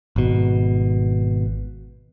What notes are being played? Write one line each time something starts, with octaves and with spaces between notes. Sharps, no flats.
G#1 B2